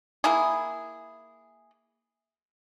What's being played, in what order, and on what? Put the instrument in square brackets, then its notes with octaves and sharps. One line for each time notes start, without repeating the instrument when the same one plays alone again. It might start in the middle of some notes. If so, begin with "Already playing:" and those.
[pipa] A#3 E4 G#4